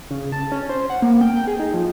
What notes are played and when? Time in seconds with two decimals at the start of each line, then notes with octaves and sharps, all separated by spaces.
0.11 C#3
0.32 A5
0.52 C#4
0.69 C5
0.90 F#5
1.02 A#3
1.21 G5
1.36 G5
1.47 G#4
1.59 D#4
1.74 F3